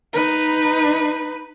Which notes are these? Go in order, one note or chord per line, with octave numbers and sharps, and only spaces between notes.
D#4 B4